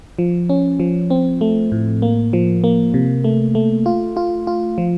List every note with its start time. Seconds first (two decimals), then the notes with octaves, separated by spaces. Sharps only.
0.19 F3
0.49 C#4
0.80 F3
1.10 C4
1.41 A3
1.72 A2
2.02 A#3
2.33 F3
2.64 A#3
2.94 C3
3.24 A3
3.55 A3
3.86 F4
4.17 F4
4.47 F4
4.78 F3